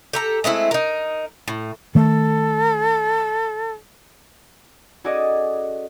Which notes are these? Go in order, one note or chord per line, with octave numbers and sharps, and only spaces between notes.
G4 A4 A#5
G#3 A3 C4 E4
D#4 A#4
A2
D#3 A3 A4
C#4 F#4 G#4 A4 D5 D#5